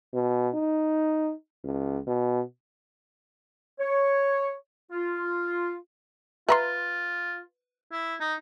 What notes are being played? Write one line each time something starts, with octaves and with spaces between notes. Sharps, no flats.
B2
D#4
C#2
B2
C#5
F4
F4 B4 E5 A#5 C6
E4
D#4